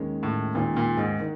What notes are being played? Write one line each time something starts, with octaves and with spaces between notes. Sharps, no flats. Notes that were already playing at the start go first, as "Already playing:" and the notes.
Already playing: D#2 D#3 G#3 C#4
A2
D#2 A#2 D#3 G#3 C#4
A#2
G#2
D#3